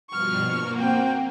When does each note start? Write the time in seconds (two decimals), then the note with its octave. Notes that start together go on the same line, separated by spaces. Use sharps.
0.10 G2 B2 F3 C#6 F6
0.43 A#3
0.76 C4 F#4 G5